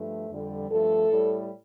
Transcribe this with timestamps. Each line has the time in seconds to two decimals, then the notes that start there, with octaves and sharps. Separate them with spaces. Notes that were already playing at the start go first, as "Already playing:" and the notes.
Already playing: G2 F3 A3
0.30 F2 D3 G3
0.69 G2 F3 A3 A4
1.10 A2 G3